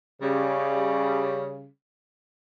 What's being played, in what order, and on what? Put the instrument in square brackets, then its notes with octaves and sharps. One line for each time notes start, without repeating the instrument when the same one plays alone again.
[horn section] C#3 G3